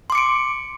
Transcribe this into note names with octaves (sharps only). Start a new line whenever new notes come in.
C6 D6 C#7 D7